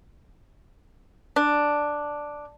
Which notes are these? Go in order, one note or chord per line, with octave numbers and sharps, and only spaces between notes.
D4